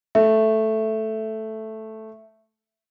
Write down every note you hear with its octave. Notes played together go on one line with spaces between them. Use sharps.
A3 E5